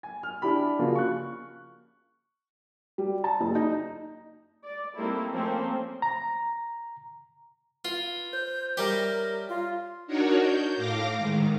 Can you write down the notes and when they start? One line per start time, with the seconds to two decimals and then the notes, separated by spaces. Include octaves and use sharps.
0.03 G#5
0.23 F6
0.42 D4 E4 G4 B5
0.79 C#3 F3 A#3 F4 F#4
0.95 C#6 F#6
2.98 G3
3.24 A5
3.41 F#1
3.55 D#4
4.65 D5
4.97 G3 A3 A#3 C4 D#4 E4
5.34 F3 A3 A#3 C4 C#4 C5
6.02 A#5
7.85 F4 B4
8.33 C5 G6
8.77 G3 G4 A#4 C#5 D5 E5
9.49 F4
10.07 D4 D#4 F#4 A#4 C#5
10.40 G6
10.77 A2 F5 D6 A#6
11.18 G#2 D#3